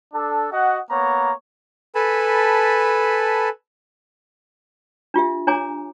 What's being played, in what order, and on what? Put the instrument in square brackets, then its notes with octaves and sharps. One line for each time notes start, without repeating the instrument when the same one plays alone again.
[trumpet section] D4 A4
F#4 D#5 F#5
A#3 B3 C#5 A#5
[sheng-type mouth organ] A4 B4 G#5 A5 B5
[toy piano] D4 F4 G4 E5
D4 C#5 G#5 A#5 D6